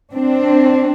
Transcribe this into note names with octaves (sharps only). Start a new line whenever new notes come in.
C4 D4